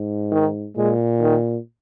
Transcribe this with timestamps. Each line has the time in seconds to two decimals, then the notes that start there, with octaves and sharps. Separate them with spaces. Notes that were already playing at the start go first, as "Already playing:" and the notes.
Already playing: G#2
0.32 D#3
0.76 A#2 G#3
1.21 D#3